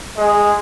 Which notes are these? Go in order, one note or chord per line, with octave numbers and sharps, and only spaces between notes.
G#3